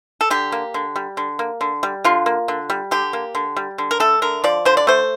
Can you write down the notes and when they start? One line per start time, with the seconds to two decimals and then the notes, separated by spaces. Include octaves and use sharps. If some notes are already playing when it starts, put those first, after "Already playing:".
0.21 A4
0.30 D3 G4
0.52 A#3
0.74 D3
0.96 G3
1.17 D3
1.39 A#3
1.61 D3
1.83 G3
2.04 D3 F4
2.26 A#3
2.48 D3
2.70 G3
2.91 D3 G4
3.13 A#3
3.35 D3
3.56 G3
3.78 D3
3.91 A#4
4.00 A3 A4
4.22 D3 A#4
4.44 F3 D5
4.65 D3 C5
4.77 D5
4.87 A3 C5